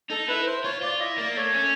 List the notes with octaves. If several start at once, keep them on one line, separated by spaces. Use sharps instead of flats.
D#4 A4
E4 B4
C5
F4 C#5
F4 D5
E4 D#5
A#3 D5
A3 C#5
C#4